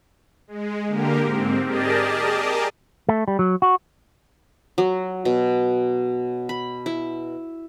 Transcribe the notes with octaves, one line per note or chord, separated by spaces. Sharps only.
G#3
D3 A#3 G4 A#4
G#2 C4
G4 G#4 A#4 D5 D#5 A5
A3
G3
F#3
F#4
F#3
B2
B5
E4